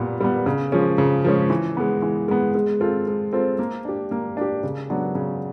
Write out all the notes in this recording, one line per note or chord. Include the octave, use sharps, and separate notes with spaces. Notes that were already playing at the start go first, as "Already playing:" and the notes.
Already playing: A#2 G3 B3
G3 B3
C#3
F3 G#3 C#4
C#3
F3 G#3 C#4
E3
G#3 B3
E3
G#3 B3
G#3
C4 F4 A4 C5
G#3
C4 F4 A4 C5
A#3
D4 G4
A#3
D4 G4
C#3
F#3 B3 D4
C#3